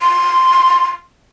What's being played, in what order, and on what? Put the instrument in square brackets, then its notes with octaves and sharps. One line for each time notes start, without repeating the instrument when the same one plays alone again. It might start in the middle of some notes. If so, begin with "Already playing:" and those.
[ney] C6